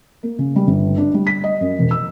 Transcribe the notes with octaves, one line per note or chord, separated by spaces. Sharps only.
A#3
C#3
G3
G1
D4
G3
B6
D#5
F#2
E1
E6